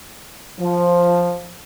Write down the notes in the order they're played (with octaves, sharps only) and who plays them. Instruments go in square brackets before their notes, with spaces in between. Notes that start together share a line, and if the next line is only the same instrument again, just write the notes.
[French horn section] F3